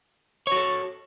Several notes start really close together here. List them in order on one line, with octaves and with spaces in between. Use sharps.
C#5 F#4 A4